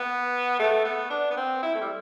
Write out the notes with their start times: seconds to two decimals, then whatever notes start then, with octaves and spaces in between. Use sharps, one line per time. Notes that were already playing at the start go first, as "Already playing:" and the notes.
Already playing: B3
0.59 A3
0.85 B3
1.10 D4
1.31 B3
1.37 C4
1.62 E4
1.75 A3
1.81 G3